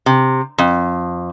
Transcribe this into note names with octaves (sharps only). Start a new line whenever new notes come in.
C3
F2